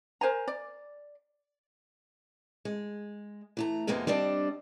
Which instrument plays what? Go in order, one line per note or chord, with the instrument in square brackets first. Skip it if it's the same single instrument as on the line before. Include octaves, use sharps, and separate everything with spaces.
[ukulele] A#4 C5 G#5 A#5
D5
[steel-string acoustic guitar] G#3
E3 A3 A#5
F2 C3 G#3 A#3 B3 D#4
G3 C4 D4 D5 D#5